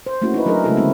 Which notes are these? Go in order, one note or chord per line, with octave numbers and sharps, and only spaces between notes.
C5
A3 A#3 C#4 E4 F#4
D#4 E4 B4
F#3 D4 E4 G#4 A#4 D#5
C#3 G#3 A3 E4 F#4 A4
D3 G#3 A#3 C4 E4